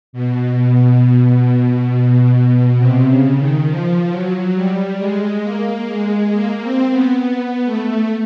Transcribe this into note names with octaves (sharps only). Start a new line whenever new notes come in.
B2
C3
C#3
D#3
F3
F#3
G3
G#3
A#3
G#3
A#3
C4
B3
B3
A3